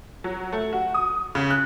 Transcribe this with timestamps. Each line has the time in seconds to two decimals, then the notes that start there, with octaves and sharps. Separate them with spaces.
0.24 F#3
0.53 A3
0.73 F#4
0.94 D#6
1.35 C#3
1.50 F#6